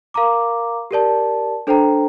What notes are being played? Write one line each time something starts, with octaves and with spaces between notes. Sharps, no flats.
A#4 F5 A#5 D6
G4 A#4 D5 A5
D4 A4 C5 G5 A#5